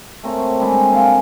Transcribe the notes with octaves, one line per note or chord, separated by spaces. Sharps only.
A3 C4 A#4 C#5
G3 G#3 D4 E5
A#3 F5 G#5